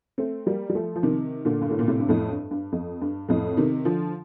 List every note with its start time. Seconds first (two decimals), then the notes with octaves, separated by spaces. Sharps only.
0.18 A3 C4
0.46 G3 A#3
0.70 G3
0.75 F3 A3
0.96 F3
1.03 C3 D#3
1.45 A#2 D3
1.61 G2
1.70 A2
1.79 A#2
1.88 A2 C3
2.00 G2
2.09 F2 A2
2.31 G2
2.51 G2
2.72 F2
3.01 G2
3.29 F2 A2
3.57 C3 D#3
3.85 D3 F3